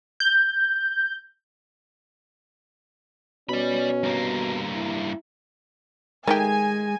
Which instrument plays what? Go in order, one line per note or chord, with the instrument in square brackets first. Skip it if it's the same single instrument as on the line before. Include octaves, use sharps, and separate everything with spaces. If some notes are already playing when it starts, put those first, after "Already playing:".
[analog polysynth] G6
[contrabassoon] B2 [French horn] C#4 [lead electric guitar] D5 B5
[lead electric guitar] G2 A#3
[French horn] E4
[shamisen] D#3 A3 G4 [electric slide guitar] G#3 [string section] G#5